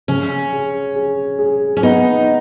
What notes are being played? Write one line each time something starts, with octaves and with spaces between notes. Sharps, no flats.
C#3 C#4
G#4
G#4
G#4
C#4
B3 D#4